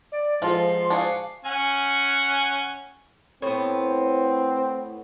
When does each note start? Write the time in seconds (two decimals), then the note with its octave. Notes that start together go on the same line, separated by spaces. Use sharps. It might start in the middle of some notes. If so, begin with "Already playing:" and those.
0.12 D5
0.42 G#2 F3 F4 A4 C6
0.90 D4 F#4 G#4 F5
1.45 C#4 F#5 G#5
3.42 A2 B3 C4